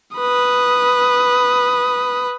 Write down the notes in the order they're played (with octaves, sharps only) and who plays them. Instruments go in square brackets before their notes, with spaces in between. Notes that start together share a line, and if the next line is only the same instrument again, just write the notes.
[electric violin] B4 D#6